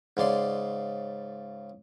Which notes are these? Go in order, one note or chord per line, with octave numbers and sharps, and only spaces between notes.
G#2 C#3 D5 C6